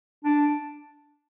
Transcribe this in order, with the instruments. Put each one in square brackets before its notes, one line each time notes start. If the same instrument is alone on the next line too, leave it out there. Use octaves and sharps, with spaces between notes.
[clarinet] D4